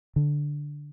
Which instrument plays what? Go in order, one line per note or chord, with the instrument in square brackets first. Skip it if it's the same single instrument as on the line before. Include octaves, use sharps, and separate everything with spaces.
[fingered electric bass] D3